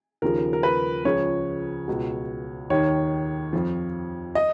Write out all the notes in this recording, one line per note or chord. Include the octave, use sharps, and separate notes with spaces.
D#2 C#3 F3 A#4
A#4
B4
C#2 C#3 F3 C#5
C#2 B2
D#2 D#3 C#5
F2 F3
D#5